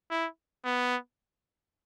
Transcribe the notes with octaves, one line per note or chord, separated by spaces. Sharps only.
E4
B3